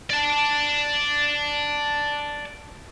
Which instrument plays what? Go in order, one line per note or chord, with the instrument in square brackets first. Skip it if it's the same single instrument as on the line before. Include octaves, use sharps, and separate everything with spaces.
[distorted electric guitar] D5 A5